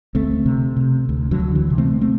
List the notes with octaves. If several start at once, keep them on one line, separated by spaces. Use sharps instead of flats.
D2 A3 C4
C3
C3
D2
D3 F#3
D2
E3
C3
A3 C4
A3 C4